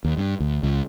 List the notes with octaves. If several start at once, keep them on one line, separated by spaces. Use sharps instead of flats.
D#2
G2
D2
C#2